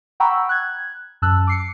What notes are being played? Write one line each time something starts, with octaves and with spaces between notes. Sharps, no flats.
F#5 G5 A#5 B5 C#6 E6
F#6 G#6
F#2 A5 E6 F#6
D6 C7 C#7